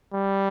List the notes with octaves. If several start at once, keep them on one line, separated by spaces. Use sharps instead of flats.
G3